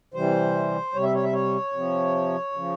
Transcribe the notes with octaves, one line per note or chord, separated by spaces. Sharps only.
C3 E3 G3 C5
C3 G3 C#5
E5
C#5
E5
C#5
C3 F3
C#3 F3